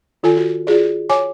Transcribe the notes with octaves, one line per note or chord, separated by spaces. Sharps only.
D#3 F4 A4 G#5
F#4
F4 F#4 G#4 D5
C#5 G#5 D6